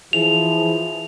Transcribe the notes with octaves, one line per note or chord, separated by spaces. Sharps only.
E3 F3 E4 G#4 F7